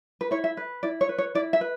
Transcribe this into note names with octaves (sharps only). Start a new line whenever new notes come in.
B4
E4 C#5
E5
B4
E4 D5
C#5
B4
C#5
E4 D5
E5
B4